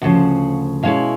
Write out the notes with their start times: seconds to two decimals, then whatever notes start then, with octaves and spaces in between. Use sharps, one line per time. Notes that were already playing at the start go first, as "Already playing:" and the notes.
0.02 D2 C#3 F3 F#5
0.83 B2 G#3 C#4 E4 F5